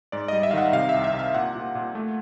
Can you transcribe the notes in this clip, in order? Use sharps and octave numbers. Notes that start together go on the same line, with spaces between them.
G#2 D5
G3 D#5
E5
F5
D#3 F#5
C3 F5
E5
C2
E5
C3
F5
A#2 F#5
A#2
A#2
A3